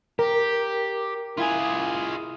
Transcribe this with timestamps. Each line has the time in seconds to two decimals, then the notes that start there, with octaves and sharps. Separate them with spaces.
0.19 G4 A#4
1.37 E4 F4 G#4 G#5